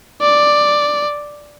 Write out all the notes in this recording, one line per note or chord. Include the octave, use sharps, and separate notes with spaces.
D5